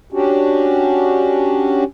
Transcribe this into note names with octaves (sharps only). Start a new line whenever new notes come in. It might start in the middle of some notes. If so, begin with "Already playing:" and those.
C#4 D4 F#4 G4